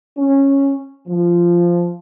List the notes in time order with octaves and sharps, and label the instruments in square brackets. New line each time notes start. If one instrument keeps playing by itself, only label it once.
[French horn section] C#4
F3